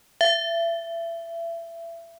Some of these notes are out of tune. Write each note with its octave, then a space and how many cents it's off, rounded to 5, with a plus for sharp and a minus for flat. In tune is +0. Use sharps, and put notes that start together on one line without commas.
E5 +30